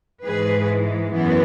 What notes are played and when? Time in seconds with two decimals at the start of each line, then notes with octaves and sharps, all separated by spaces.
0.24 G#2 E3 G#3 G#4 B4
1.13 F#2 E3 B3